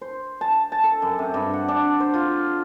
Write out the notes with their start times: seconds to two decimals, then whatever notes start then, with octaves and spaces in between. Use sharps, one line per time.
0.01 C5
0.41 A5
0.72 A5
0.84 A4
1.02 F#2
1.19 C3
1.34 G2
1.54 F#5
1.68 D4
2.00 C5
2.14 F4